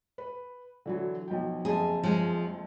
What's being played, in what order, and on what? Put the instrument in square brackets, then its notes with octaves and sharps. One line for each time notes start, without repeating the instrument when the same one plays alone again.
[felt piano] B4
D3 E3 F#3
B1 F3 G5
[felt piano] F#1 F2 A5 [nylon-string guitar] G#4
[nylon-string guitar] F3 G#3